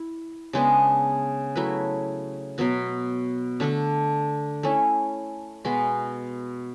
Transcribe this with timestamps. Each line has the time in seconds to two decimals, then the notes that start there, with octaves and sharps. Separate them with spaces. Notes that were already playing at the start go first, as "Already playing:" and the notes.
Already playing: E4
0.53 C#3 G#3 B3 D4
1.56 F#3 A3 E4 B4
2.58 B2 F#3 B3 F#4
3.60 D3 A3 D4 A4
4.63 A3 C#4 E4
5.65 B2 G#3 B3 F#4